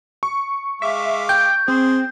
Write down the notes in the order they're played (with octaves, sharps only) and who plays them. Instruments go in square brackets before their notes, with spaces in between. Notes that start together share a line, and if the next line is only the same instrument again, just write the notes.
[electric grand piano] C#6
[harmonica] G#3 F5 D6 [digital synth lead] E5
[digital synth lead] G5 [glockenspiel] G6
[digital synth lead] C4 [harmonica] G#4 C5